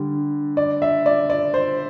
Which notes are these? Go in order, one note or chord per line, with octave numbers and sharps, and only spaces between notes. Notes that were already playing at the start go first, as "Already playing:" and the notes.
Already playing: D3 G3
D5
E5
D5
D5
C5